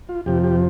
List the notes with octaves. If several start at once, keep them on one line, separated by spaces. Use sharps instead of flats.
F4
F2 C3 F3 G4
G4